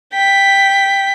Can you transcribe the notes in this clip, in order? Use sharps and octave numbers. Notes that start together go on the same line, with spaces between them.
G5 B6